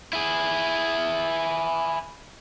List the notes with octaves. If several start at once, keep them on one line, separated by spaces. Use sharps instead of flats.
E4 G#4